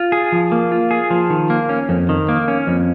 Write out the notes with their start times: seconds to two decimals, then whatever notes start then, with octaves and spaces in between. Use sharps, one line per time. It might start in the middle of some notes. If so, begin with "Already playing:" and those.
Already playing: F4
0.12 G#4
0.32 F3
0.52 A#3
0.72 F4
0.91 G#4
1.10 F3
1.30 D#3
1.50 A#3
1.69 C#4
1.89 F2
2.09 D#3
2.29 A#3
2.48 C#4
2.67 F2